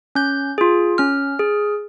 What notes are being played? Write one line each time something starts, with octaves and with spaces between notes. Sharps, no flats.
C#4 G6
F4 G#4
C#4 F6
G#4